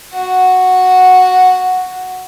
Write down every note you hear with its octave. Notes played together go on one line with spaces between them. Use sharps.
F#4 F#5